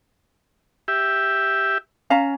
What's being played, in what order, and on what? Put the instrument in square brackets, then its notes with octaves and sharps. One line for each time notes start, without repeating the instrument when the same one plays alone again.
[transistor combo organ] G4 E5
[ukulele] C#4 F5 A#5